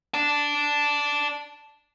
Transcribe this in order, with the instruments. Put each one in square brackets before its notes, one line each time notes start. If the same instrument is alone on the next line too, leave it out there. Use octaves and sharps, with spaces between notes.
[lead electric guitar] D5 A5